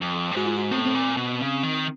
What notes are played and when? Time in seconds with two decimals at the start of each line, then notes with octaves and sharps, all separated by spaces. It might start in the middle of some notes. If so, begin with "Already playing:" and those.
0.01 F2
0.31 G2
0.36 G#2 F#4
0.46 F4
0.56 F#4
0.71 A2 C4
0.78 B3
0.85 C4
0.95 A#2
1.17 B2
1.41 C#3
1.63 D#3